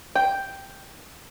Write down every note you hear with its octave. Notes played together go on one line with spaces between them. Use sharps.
G5